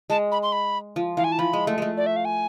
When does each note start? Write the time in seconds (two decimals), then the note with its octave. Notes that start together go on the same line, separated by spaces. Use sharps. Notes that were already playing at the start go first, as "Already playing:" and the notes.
0.10 G#3 A5
0.32 B5
0.43 C6
0.52 B5
0.96 F3
1.17 E3 F5
1.24 G#5
1.32 A5
1.39 F3 B5
1.53 G#3
1.67 A3
1.78 G#3 A3
1.97 D5
2.06 E5
2.16 F5
2.25 G#5